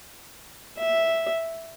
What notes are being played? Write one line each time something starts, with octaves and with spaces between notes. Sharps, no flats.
E5